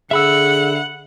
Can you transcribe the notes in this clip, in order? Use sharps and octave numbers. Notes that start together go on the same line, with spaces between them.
D3 G#4 E5 F#5 B5 E6